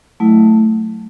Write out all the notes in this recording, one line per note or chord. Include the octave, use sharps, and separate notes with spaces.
F#3 A3 E4